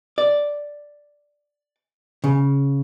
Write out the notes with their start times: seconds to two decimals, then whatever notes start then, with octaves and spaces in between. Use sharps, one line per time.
0.18 D5
2.24 C#3